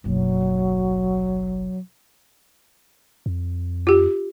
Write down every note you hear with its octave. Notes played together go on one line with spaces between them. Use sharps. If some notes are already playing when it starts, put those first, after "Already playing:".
F#1 B1 F#3
F2
F4 G4